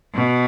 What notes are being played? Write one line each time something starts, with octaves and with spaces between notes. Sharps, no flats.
B2